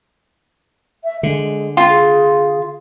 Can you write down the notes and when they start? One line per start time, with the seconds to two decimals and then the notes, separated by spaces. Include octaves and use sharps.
1.04 E5
1.23 D3 G#3
1.77 F4
1.89 G#4